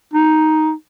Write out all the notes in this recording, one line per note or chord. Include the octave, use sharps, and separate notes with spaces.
D#4